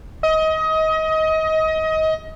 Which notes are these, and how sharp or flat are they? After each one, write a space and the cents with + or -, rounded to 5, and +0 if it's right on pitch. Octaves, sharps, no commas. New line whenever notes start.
D#5 +25